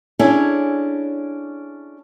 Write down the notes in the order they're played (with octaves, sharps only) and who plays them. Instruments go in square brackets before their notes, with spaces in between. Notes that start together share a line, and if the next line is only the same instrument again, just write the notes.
[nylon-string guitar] C#4 D4 E4 G#4 A4 C#5